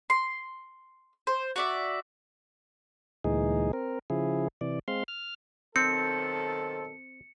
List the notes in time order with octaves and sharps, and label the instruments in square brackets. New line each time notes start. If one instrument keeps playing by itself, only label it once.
[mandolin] C6
C5
F#4 D5 E5
[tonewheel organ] D2 A#2 E3 G#3 D#4 G#4
C4 A#4
C#3 F3 E4 G#4
C3 E3 D5
G#3 C4 F5 C6
F6
[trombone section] B1 D#3 A4 [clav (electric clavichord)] C4 [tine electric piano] C5 [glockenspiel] C#7